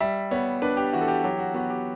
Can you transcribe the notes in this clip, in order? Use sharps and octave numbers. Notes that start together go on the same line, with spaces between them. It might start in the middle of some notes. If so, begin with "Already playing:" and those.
G3 E5
B3 C#5
D4 B4
G4
E3 F#4
A4
G4
F#3 G4
F#4
B3 F#4
G4